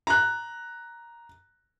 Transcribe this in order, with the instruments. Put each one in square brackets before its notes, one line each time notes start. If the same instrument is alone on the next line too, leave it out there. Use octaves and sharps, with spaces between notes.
[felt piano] A#5 F#6